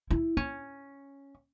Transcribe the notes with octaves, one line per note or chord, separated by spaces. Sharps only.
E4
C#4